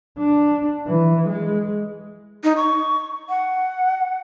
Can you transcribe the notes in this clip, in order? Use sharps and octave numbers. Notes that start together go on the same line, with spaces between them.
D4
E3
G#3
D#4
C#6
F#5